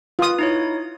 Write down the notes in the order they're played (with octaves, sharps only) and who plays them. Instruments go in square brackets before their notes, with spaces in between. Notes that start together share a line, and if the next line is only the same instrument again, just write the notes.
[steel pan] F4 D#6 [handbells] B4
[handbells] D#4 E4 C#5